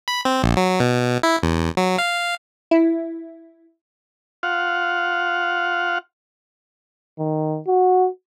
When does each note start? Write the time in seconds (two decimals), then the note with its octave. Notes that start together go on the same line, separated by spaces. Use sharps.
0.08 B5
0.25 C4
0.44 A#1
0.57 F#3
0.80 B2
1.23 E4
1.43 E2
1.77 F#3
1.98 F5
2.71 E4
4.43 F4 F5 F#5
7.19 D#3
7.67 F#4